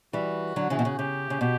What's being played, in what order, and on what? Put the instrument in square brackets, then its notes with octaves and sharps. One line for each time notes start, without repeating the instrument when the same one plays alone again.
[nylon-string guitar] E3 G3 [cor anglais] F#4
[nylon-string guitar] D3 F#3
C#3 E3
B2
C#3
[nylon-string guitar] C#3 [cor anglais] G4
[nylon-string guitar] C#3
[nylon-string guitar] B2 [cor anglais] G4